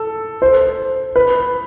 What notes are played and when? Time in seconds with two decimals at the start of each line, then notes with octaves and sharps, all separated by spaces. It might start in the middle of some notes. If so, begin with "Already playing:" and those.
Already playing: A4
0.42 C5
1.16 B4